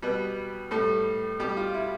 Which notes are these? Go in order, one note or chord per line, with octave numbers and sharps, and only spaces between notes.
B2 G3 B4
A2 G3 A4
B2 G3 G4
F4
E4